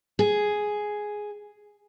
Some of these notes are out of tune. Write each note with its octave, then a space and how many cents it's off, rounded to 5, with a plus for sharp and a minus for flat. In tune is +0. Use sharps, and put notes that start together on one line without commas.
G#4 +5